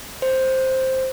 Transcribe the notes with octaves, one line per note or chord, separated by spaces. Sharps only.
C5